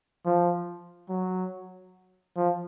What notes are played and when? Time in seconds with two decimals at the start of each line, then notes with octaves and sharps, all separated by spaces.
0.25 F3
1.09 F#3
2.36 F3